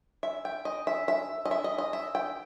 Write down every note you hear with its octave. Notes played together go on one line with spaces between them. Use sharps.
E5
G5
D#5
E5
E5
D#5
E5
D#5
D#5
E5
G5